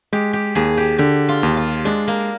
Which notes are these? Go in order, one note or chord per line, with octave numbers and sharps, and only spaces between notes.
G#3 G4
G4
D#2 G#4
G4
D3 G4
F4
D#2
F4
G#3 D4
A#3